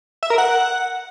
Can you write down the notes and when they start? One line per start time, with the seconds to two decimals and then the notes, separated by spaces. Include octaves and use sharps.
0.23 E5
0.30 A#4
0.38 F#5